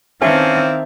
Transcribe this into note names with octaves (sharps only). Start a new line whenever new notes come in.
D#3 C4 C#4 E4 D5 E5 F5 A5